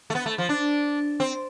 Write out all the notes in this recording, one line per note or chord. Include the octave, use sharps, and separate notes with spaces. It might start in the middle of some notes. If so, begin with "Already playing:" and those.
A3
B3
A3
F3
D4
C4